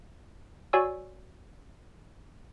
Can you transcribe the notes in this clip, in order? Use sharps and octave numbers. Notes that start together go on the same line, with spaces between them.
F#4 C#5 D5 G#5 C#6 E6